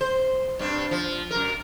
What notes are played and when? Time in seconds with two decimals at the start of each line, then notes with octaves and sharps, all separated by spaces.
0.01 C5
0.59 G2 C4 D4
0.91 F3
1.31 F#2 A#4